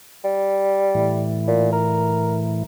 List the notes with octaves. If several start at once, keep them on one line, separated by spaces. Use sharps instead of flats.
G3
A2 E3
A#2
A#4